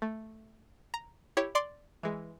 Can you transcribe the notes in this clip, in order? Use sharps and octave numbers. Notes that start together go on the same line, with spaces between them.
A3
A#5
E4 G4 C#5
D5 C6 D6
E3 G#3